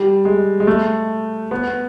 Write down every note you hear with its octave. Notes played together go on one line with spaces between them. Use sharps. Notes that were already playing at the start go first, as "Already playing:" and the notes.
Already playing: G3
G#3
G#3
A3
B3